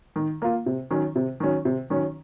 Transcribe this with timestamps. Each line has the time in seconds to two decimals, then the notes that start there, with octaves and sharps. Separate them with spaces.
0.16 D#3
0.42 A#3 F4
0.66 C3
0.90 D#3 F#3 C#4
1.16 C3
1.40 D#3 F#3 C#4
1.65 C3
1.90 D#3 F#3 C#4